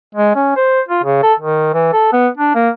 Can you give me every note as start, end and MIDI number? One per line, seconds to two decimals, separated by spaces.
0.15 0.35 56
0.35 0.56 61
0.56 0.81 72
0.89 1.03 65
1.03 1.20 49
1.23 1.34 69
1.40 1.70 51
1.74 1.92 52
1.93 2.11 69
2.13 2.28 59
2.37 2.53 62
2.55 2.69 58